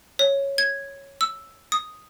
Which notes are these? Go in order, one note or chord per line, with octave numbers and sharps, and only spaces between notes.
C#5
G#6
E6
D#6